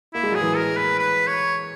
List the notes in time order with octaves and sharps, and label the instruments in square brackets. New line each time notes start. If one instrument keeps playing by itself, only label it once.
[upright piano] A#3 [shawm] E4
[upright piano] G#3
[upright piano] F#3 [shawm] G#4
[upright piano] E3 G#3
[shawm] A#4
B4
B4
C#5